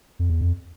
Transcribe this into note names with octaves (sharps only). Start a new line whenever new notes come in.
F2
E2
F2